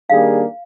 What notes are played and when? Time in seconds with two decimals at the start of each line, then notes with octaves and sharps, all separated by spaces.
0.10 D#3 G3 A#3 D4 G#4 F5